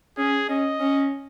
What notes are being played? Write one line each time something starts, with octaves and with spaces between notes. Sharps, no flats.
C#4 G#4
C#4 D#5
C#4